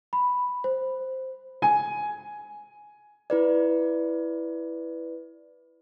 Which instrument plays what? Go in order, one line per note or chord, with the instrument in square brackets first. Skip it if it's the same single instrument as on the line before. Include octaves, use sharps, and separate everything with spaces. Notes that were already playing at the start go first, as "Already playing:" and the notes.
[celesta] B5
C5
[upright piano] G#5
[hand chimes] E4 B4 D5